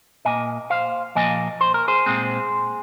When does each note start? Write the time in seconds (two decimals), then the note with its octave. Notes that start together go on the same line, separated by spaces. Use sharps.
0.25 A#2 A#3 D#5 G#5
0.70 C5 F5
1.15 A#2 F3 A#3 D#5 G#5
1.61 C5
1.74 A#4
1.88 G#4 C5
2.06 A#2 G#3 C4